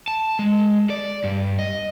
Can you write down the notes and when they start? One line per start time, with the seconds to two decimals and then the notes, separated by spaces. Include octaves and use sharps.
0.08 A5
0.39 G#3
0.90 D5
1.24 G2
1.59 D#5